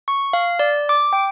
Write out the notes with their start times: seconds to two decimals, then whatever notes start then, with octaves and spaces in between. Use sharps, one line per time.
0.08 C#6
0.33 F5
0.59 D5
0.89 D6
1.13 G5